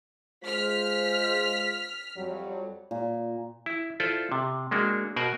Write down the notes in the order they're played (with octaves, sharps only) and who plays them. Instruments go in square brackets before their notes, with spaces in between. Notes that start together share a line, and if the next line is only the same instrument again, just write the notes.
[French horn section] G#3 F4 C5 [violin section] F6 B6
[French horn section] F2 F#3 G3
[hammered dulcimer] A#2
[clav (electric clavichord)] E4
E4 F4 A4 C5 D5
C3
G#3 A#3 D4 F#4
B2 F#4 A#4 C5 F#5 G#5